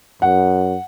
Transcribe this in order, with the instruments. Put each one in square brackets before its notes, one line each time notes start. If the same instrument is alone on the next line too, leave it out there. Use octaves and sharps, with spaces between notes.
[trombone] F#2 [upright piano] F#5